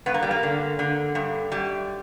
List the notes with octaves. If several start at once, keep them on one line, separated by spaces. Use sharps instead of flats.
G2 B3
A#3
G3
A#3
D3
D3
G2
F#2 G3